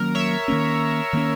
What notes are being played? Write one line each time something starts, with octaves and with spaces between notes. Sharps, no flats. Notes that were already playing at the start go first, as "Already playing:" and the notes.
Already playing: D#3 F#3 A#3 C#4 A#4
C#5 E5
D#3 A#3 C#4
D#3 A#3 C#4